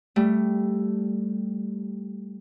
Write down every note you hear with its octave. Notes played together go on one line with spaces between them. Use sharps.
G3 A3